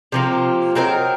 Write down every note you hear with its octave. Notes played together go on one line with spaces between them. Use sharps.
C3 F3 A#3 F4
F#3 C4 D#4 A#4